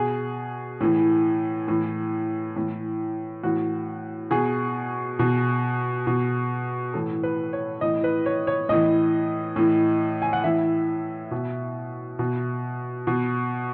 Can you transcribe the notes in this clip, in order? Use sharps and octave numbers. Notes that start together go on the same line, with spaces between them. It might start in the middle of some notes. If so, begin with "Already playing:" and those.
Already playing: B2 G#4
A2 E3
A2 E3
A2 E3
A2 E3 F#4
B2 G#4
B2
B2
A2 E3 A4
B4
C#5
A2 E3 D#5
B4
C#5
C#5
A2 E3 D#5
A2 E3
G#5
F#5
A2 E3 E5
B2
B2
B2